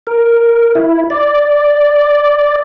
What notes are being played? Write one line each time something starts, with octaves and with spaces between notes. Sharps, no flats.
A#4
E4
D5